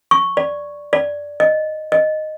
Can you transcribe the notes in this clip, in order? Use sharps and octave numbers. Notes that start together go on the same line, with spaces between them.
C#6
D5
D5
D#5
D#5